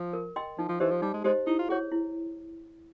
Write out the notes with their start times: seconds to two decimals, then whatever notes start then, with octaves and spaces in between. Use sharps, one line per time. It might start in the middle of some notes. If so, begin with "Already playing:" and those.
Already playing: F3
0.13 A#4
0.36 D#5 G5 C6
0.58 F3 D#4
0.69 F3
0.80 E3 G4 C5 D#5
0.91 F3
1.02 G3 D#4
1.14 G#3
1.24 G#3 G4 C5 D#5
1.46 D#4 E4
1.59 F4
1.69 F#4 G#4 C#5
1.92 E4